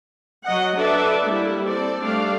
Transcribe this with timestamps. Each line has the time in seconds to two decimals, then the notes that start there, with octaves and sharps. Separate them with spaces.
0.45 F#3 D#5 F#5
0.77 D4 A4 B4 D5 E5
1.23 G3 A#3 E4
1.65 C4 A4 D5
2.01 G3 A3 D4 D5 F5